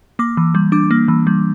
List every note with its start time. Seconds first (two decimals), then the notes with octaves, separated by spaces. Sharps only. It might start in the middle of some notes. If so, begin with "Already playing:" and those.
0.19 A#3 D6
0.37 E3
0.55 G3
0.72 D4 D6
0.91 A#3
1.08 E3
1.27 G3